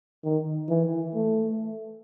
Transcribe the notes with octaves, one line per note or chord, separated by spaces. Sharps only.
D#3
E3
A3